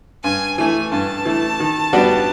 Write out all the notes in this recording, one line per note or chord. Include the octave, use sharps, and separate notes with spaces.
G2 G#5
E3 A3 G#5
G2 A5
E3 A3
D#3
G3 B3 D4 F#4